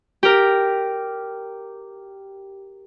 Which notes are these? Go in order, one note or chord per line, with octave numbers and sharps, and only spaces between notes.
G4 A#4